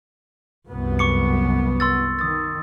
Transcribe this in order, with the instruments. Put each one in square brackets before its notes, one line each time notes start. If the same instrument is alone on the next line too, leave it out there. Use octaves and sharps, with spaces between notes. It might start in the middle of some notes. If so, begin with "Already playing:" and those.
[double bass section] C2 F#2 B3
[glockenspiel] C#6 D6 C#7
C6 E6 A6
[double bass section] D#3 [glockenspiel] D#6 A6